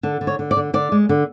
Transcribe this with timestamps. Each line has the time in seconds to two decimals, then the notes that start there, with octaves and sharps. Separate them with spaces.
0.03 D3 A4
0.21 D3
0.27 C#5
0.39 D3
0.51 D5
0.57 D3
0.74 D3 D5
0.92 G#3
1.09 D3